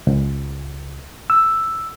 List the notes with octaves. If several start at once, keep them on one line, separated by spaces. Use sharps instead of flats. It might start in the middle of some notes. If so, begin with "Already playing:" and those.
C#2
E6